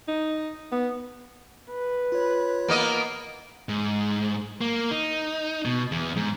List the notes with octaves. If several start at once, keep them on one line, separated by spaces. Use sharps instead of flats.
D#4
B3
B4
F4 C#5
A#3 B3 D#5
G#2
A#3
D#4
B2
E2
G#2